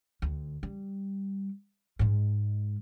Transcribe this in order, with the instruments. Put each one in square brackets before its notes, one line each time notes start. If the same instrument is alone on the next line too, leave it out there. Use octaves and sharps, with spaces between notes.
[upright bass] D2
G3
G#2 G#3